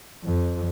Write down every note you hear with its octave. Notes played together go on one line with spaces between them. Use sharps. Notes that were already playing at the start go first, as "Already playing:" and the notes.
F2